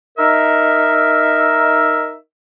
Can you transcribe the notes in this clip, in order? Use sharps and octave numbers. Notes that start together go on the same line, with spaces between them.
D#4 A#4 E5